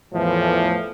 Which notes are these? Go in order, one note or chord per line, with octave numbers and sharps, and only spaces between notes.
E2 A2 E3 F3 A3